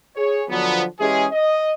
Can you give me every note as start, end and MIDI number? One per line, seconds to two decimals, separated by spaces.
0.16 0.42 68
0.16 0.42 73
0.49 0.84 50
0.49 0.84 53
0.49 0.84 54
0.49 0.84 59
0.99 1.26 52
0.99 1.26 56
0.99 1.26 61
0.99 1.26 67
0.99 1.26 68
1.32 1.74 75